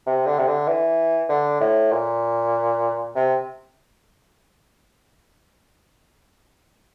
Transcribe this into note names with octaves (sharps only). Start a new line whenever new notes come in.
C3
D3
C3
D3
E3
D3
A2
A#2
C3